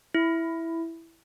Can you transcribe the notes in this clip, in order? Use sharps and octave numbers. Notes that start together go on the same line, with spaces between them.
E4